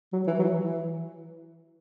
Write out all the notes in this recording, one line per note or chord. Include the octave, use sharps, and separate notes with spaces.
F#3
E3
F#3
E3
E3